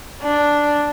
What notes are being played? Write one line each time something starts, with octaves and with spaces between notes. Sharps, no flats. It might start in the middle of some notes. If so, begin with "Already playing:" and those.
D4